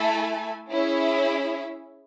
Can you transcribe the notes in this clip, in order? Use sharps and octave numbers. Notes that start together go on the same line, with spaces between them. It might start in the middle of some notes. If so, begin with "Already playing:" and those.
Already playing: A3 E4 A4 E5 G#5
C#4 E4 G#4 C#5 E5